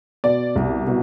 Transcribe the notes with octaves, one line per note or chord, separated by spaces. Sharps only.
B2 D5
C2
B2